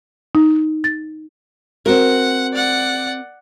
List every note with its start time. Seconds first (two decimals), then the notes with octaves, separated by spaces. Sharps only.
0.35 D#4
0.84 A6
1.86 C4 F#4 A#4 F#5
2.54 D5 F#5